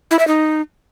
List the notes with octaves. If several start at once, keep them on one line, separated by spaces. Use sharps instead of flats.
E4
E5
D#4